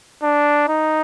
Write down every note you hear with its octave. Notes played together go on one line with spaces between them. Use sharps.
D4
D#4